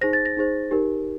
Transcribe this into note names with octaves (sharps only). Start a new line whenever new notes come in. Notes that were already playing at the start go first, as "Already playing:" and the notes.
D#4 G#4 C5 A#6
A6
A#6
D#4 G#4 C5
D#4 G4 A#4